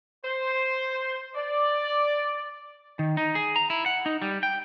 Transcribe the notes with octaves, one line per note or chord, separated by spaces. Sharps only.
C5
D5
D#3
D#4
G#4
A#5
E4
F#5
D#4
G3
G5